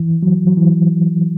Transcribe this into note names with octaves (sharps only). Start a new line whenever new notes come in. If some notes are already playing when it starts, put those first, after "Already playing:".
Already playing: E3
F#3
F#3
E3